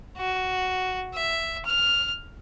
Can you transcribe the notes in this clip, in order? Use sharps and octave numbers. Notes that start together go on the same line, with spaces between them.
F#4
E5
F6